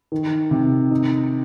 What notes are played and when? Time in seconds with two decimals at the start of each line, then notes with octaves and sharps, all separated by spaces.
0.12 D#3
0.51 C3
0.91 D#4